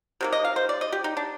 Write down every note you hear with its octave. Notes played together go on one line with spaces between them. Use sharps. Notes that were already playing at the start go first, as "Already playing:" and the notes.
C3 D#3 A#3
D#5
F5
C5
D5
D#5
G4
D#4
D4